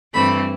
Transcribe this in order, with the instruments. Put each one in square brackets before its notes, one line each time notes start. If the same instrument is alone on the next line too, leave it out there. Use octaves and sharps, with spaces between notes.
[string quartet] G2 E3 A3 C4 B5